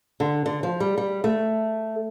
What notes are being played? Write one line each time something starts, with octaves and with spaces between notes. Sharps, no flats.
D3
D3
F3
G3
G3
A3